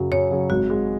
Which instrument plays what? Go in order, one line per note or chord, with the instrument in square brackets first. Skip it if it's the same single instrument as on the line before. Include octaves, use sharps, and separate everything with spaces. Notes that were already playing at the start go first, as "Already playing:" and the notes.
Already playing: [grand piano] F#2 C#3 F#3
[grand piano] F#2 [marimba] C#5
[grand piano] C#3 F#3
[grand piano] G#1 [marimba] F#4
[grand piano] G#2 G#3